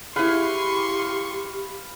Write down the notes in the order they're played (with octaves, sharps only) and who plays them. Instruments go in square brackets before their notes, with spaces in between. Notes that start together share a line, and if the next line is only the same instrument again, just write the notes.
[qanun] E4 G#4 [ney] G4 [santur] B4 F5 [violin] C6 C#6